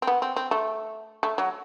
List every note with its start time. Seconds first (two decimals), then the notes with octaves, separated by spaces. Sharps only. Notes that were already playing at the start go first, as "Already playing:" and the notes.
0.02 C4
0.07 B3
0.22 C4
0.36 C4
0.51 A3
1.23 A3
1.38 F#3